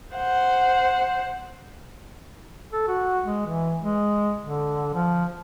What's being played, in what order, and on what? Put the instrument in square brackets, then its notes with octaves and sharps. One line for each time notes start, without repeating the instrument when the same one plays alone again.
[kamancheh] C5 F#5
[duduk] A4
F#4
G#3
E3
G#3
D3
F3